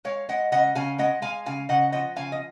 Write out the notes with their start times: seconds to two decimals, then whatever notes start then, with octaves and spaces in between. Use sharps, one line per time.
0.05 G#3 C#5 F5
0.29 G#3 D#5 F#5
0.52 C#3 D#5 F#5
0.75 C#3 F5 G#5
0.98 G#3 D#5 F#5
1.22 G#3 F5 G#5
1.46 C#3 F5 G#5
1.69 C#3 D#5 F#5
1.92 F3 D#5 F#5
2.16 C#3 F5 G#5
2.32 D#5